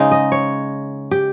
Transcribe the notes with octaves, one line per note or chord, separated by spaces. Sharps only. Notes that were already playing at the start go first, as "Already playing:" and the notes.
Already playing: C#3 G#3 D#4
D#5
C#5
G4